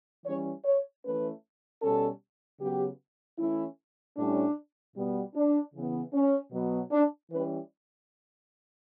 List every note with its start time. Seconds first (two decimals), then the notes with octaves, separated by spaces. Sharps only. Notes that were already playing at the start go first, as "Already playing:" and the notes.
0.25 E3 G3 C#4 C#5
0.65 C#5
1.04 E3 A3 C#4 B4
1.82 B2 G3 C#4 A4
2.60 C#3 F#3 B3 G4
3.39 E3 A3 C#4 E4
4.16 A2 G3 C#4 D4
4.95 B2 G3 B3
5.34 D4
5.74 C#3 E3 B3
6.13 C#4
6.52 B2 F#3 B3
6.91 D4
7.30 E3 G3 C#4 B4